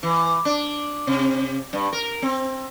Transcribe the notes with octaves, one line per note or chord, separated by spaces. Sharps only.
E3
D4
C3
G2
A#4
C4